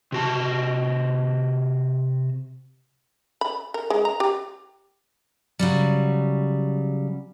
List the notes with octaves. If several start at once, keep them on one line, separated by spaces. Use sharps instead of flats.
C3 F#4 A5
B5
A#4
G#3
A#5
G4
C#3 F#3 G3